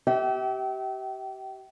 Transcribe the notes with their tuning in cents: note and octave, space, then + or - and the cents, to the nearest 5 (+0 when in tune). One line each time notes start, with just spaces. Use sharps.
G4 -30 E5 -30 G5 -40